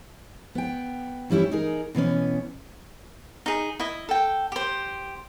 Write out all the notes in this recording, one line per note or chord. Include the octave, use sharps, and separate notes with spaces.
B3 G5
E3 G3 C#4 E4 G4
D#4 G#4 A#4
B2 E3 B3 C#4
D#4 G#4
E4 D#5
A4 G5
G4 C5